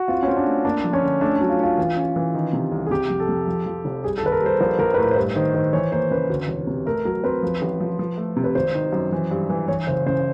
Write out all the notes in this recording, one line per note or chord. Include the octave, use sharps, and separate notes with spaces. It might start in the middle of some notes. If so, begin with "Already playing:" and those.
Already playing: F#4
C4 F4
C#4
C4
D4
A3
A#3 D4
F3
C#4
D3
A3 D4
D4
F#3
F4
C#4 F4
E3
C#4
E3
D#3
C3
C2
G#4
C3 G4
F2
A4
F2
F3
F3
F1
G3 G#4
A4
D#2 B4
A#4
G3 C5
A#1 B4
A#1 A#4
B4
A2 A#4
C5
G2 B4
D#3 C5
D#3 C5
E3 C#5
A#3 C5
C#3 B4
D2
E1
C3
A3 A#4
F#3 A#4
C4 B4
F3
A1
F3
F3
A3
C3
B4
G#1 C5
D#3
F#2
E3
G2
E3
E3 C#5
F#1 C5
C#3 C5